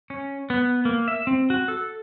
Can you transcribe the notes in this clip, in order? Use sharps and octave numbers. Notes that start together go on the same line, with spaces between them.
C#4
B3
A#3
E5
C4
F#4
A4